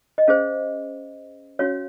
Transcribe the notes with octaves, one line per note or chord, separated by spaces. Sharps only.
D#5
C#4 G#4 C5 F5
C#4 F#4 C#5 F5